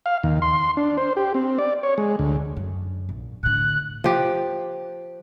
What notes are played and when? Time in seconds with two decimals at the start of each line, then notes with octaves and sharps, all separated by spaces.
0.06 F5
0.23 D#2
0.42 C6
0.77 D4
0.98 C5
1.17 G4
1.34 C4
1.59 D5
1.83 C#5
1.98 G#3
2.19 D2
2.57 F#2
3.09 A#1
3.43 A2 D3 F#6
4.04 F3 G4